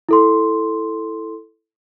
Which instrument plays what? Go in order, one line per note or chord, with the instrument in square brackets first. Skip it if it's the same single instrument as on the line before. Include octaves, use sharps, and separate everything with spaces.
[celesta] E4 A4 C6